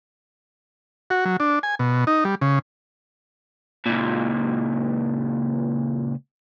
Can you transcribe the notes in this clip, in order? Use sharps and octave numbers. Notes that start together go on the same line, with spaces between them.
F#4
F#3
D4
G#5
B2
D#4
G3
C#3
C#2 A#2